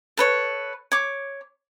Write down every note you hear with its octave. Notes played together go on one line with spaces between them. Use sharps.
A4 B4 C#5
C#5 D6